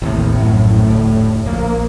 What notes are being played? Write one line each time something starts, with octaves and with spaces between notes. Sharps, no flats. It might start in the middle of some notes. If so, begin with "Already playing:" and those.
A1 D#2 A2 C3
A#1 F#2
F1 D2
A#1 A#3